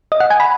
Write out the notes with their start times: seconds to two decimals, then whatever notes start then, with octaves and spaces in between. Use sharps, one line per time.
0.12 D#5
0.20 F#5
0.30 G#5
0.40 B5